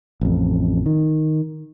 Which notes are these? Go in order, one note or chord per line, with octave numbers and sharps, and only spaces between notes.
A1 F2
D#3